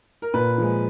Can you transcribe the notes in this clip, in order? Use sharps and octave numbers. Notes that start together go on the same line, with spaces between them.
A#4
A#2 B4
F3 G#3